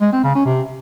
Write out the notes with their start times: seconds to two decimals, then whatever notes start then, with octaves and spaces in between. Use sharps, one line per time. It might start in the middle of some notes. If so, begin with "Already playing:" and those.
0.01 G#3
0.13 C4
0.24 C#3
0.35 C#4
0.46 C3